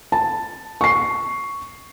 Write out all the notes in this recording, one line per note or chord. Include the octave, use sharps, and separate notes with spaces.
A5
C#6 C7